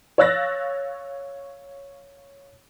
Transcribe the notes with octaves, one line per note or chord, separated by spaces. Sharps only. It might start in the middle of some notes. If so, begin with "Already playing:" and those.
C#5 F5 E6 F#6 A6 A#6